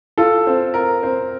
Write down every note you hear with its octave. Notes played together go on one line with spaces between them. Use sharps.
F4 A4
C4
A#4
C4